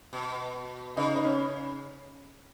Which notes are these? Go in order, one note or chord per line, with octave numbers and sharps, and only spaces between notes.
B2
C#3 D#4
D#4
C#4